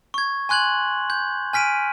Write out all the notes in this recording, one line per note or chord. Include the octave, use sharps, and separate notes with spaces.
C#6 G#6
G#5 C6 F#6 G#6 F#7
G6
G#5 F6 B6 D7 D#7